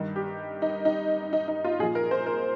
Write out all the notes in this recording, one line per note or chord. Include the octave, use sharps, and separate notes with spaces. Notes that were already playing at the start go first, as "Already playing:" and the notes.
Already playing: G2 D#3
G4
D#4
D#4
D#4
D#4
F4
A#2 F3 G#4
A#4
C5
A#4